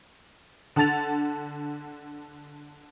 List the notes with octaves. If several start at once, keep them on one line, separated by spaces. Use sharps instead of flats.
D3 F#5 A5 A6 F7